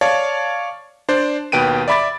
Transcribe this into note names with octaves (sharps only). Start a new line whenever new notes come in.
C#5 D5 F5 A5
D4 C5 D5
D#2 B2 B4 G5 D7 D#7
D5 E5 B5 D6 A6